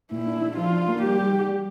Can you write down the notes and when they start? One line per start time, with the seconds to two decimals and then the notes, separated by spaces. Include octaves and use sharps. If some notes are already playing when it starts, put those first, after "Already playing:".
0.11 A#2 E4
0.27 D4
0.42 D4
0.57 F3 F4
0.73 D4
0.88 A#3
1.02 G3 G4
1.18 G3
1.33 G3
1.49 G3